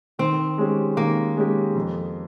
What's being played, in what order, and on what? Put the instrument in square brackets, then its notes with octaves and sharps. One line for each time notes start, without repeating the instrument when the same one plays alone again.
[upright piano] D#3 [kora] C4
[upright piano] G#3 C#4 G4
[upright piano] D#3 [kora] A#3
[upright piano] G#3 C#4 G4
F2